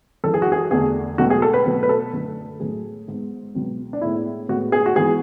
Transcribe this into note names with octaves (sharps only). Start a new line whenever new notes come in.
F#2 E3 G#3 A4
G#4
F#4
G#4
E2 D3 A3 G#4
C#2 B2 F#3 A3 F#4
G#4
A4
B4
B2 F#3 A3 B4
B4
A4
F#2 D3 A3
A2 F#3 A3 G#4
G#2 G#3 B3
C#2 B2 F#3 B3
D4
A2 G#3 B3 E4
A2 G#3 B3 F#4
G#4
F#4
G#2 E3 B3 G#4